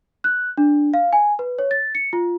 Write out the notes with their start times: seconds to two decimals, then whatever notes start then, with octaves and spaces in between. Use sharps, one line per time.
0.24 F#6
0.58 D4
0.94 F5
1.13 G#5
1.39 B4
1.59 C#5
1.71 A6
1.95 C#7
2.13 F4